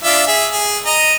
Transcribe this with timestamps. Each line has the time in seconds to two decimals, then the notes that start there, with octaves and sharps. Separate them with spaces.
0.04 D4 F4 E5
0.28 G#4 E5
0.51 G#4
0.86 D#5 A#5